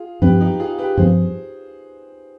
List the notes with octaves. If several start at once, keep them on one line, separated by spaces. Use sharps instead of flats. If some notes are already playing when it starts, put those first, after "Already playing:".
Already playing: F4 G#4
G2 F3 C4 G4 B4
D#4 G4
F4 G#4
G4 B4
G2 F3 C4 G#4 C5